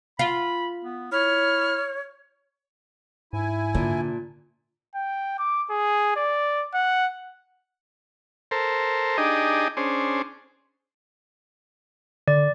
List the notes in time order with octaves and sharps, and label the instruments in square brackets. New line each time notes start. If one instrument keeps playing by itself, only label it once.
[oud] F4 [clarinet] B5
[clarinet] B3
[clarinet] E4 [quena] C#5 [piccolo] F6
[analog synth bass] G#2 [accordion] E4 G#5
[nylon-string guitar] A#2 D4 [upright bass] D3
[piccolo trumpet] G5
D6
G#4
D5
F#5
[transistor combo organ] A4 A#4 C5
D4 D#4 G4 G#4 D#5
C#4 D4 G#4 C5
[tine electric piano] D3 [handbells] D5